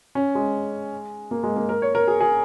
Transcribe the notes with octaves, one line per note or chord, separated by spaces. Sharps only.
C#4
G#3
A#3
G#3
A#3
A#4
C#5
A#4
G#4
G#4